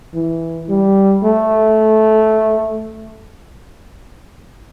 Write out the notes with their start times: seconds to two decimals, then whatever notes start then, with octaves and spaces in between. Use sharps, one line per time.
0.14 E3
0.69 G3
1.23 A3